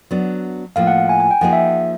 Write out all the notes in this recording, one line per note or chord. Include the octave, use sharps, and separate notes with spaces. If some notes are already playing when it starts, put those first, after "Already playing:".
F#3 B3 D4
A2 F3 A#3 F5
F#5
G#5
G#5
G5
F3 A#3 D#4 G#4 F#5
E5